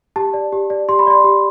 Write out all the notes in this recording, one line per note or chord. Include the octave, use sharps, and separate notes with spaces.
G4 A5
D5
G4
D5
G4 C6
B5
D5 C6
G4